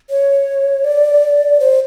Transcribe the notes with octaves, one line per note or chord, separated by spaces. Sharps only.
C#5
D5
C5